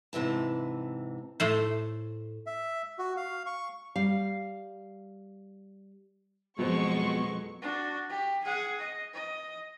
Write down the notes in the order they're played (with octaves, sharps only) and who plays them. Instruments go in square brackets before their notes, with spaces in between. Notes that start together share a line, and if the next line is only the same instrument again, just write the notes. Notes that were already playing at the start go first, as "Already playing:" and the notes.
[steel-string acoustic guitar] G#2 C3 E3 A5
[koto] A2 A3 C5
[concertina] E5
F#4
F5
C#6
[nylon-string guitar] G3 F5
[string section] F2 C#6 [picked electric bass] B2 [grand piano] F#3 C5 [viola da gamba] G#3
[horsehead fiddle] D4 F#4
G4
G#4 F#5
D#5
D#5